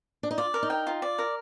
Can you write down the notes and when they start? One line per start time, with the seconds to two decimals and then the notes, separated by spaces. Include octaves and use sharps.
0.23 D4
0.31 D#4
0.38 F4 D5
0.54 A#4
0.63 D#4
0.70 G5
0.87 F4
1.02 D5
1.19 A#4